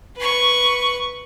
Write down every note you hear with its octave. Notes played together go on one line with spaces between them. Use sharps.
B4 C#6